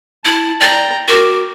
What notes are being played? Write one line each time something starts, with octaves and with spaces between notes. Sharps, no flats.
E4 A5
D5 G5 A#5
F#4 A#4 D6